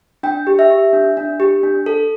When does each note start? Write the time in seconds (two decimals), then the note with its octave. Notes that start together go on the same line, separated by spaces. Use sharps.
0.23 D4 G5
0.47 G4
0.59 E5
0.70 G4
0.93 D4
1.17 D4
1.40 G4
1.63 D4
1.86 A4